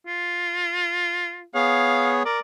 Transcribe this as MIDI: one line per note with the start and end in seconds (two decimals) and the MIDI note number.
0.07 1.45 65
1.55 2.23 59
1.55 2.23 68
1.55 2.23 73
1.55 2.12 77
2.25 2.40 70
2.25 2.39 74